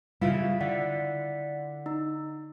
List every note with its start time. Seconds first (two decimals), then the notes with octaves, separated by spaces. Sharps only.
0.21 C#3 E3 G3 E4 F4
0.61 D3 D5 F#5 B6
1.86 D#4